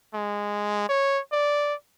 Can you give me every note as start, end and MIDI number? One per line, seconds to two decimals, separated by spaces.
0.14 0.88 56
0.89 1.20 73
1.33 1.74 74